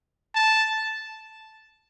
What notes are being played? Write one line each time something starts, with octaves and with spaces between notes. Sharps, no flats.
A5